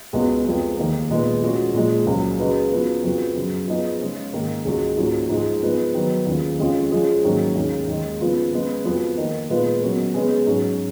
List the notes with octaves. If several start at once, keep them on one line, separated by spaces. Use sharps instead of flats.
C#2 B2 G#3 B3 F#4
F2 F3 G#3 B3
D#2 D#3 A#3
A#2 G#3 B3
F3 G#3 C#4 F#4
A#2 F3 G#3
C#2 C#3 F#3 A#3
C#3 G#3 D#4 F#4 B4
C#3 F3 B3 F#4
F2 C#3 F3 B3 F#4
F#2 C#3 F#3
F3 B3 D#4 G#4
C#3 G#3 C#4
G#2 D#3 A#3
C#2 C#3 G#3 D#4 F#4
G#2 F3 A#3 C#4 F#4
G#2 F3 G#3 D#4 G#4
F3 G#3 B3
D#3 F#3 B3
D#2 C#3 F3
F2 C#3 G#3 C#4 F4
F3 G#3 C#4 G#4
G#2 D#3 F#3 A#3 C#4
D#2 C#3 G#3 C#4
D#2 D#3 G#3
C#3 F3 B3 F4
C#3 G#3 B3
F2 F3 B3 F#4
D#3 A#3 D#4 A#4
A#2 G#3 B3 F4 B4
B2 F#3 C#4 F#4 A#4
B2 G#3 C#4 G#4 B4
G#2 F#3 C#4 F#4